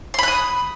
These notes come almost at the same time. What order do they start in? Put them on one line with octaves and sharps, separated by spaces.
C6 B5 F#6 D#6